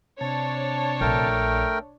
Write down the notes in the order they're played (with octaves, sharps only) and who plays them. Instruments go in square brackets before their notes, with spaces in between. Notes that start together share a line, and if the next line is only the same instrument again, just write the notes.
[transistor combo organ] C3 A5 [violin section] D4 C#5
[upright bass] A#1 [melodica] A3 A#4 G5